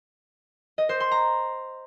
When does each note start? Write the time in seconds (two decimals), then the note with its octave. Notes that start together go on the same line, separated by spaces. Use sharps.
0.78 D#5
0.89 C5
1.00 C6
1.11 A#5